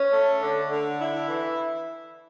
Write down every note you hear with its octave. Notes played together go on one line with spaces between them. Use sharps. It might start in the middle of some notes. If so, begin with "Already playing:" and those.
Already playing: C#4
A3
D3
D3
E4
E3